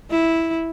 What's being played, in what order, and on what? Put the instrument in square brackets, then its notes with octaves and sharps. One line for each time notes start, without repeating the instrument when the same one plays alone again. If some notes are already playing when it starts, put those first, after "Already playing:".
[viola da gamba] E4